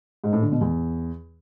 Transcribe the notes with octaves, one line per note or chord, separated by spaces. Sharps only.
G#2
A2
D3
B2
E2